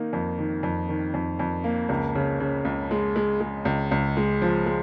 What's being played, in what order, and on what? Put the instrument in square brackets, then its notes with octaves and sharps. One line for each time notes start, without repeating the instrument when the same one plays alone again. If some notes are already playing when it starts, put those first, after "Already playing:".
Already playing: [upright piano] D#3 A#3 D#4
F2
D#3
F2
D#3
F2
F2
A#3
C#2
C#3
C#3
C#2
G#3
G#3
G#3
C#2
C#2
G#3
F3
G#3